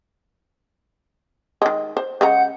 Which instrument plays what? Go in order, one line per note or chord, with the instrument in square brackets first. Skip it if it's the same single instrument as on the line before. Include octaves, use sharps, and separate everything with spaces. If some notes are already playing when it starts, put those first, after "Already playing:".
[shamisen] D#3 G#3
C5
[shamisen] C#3 G#3 A#5 [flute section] F#5 G6